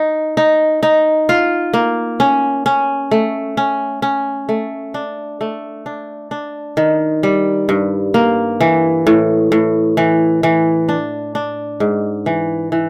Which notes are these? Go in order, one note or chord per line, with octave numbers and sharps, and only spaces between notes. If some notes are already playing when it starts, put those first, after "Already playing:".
Already playing: D#4
D#4
D#4
F4
A#3
C#4
C#4
A3
C#4
C#4
A3
D4
A3
D4
D4
D#3
G3
G2
A#3
E3
A2
A2
E3
E3
D4
D4
G#2
E3
E3